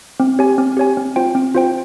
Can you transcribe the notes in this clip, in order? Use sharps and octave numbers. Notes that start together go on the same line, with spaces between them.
C4
G4 C#5 G#5
C4
G4 C#5 G#5
C4
F4 C5 G5
C4
F4 C5 G5